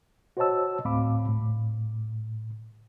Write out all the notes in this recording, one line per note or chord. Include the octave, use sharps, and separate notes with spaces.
F#4 C5 C#5 D#5 A5 E6
D2 A2 C4 F5 B5 D6
A2